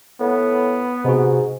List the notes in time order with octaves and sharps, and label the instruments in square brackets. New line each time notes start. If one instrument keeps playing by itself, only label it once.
[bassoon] A2 [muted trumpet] B3
[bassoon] G#2 [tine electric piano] C3 F#4